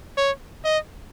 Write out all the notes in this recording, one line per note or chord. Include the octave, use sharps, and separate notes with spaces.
C#5
D#5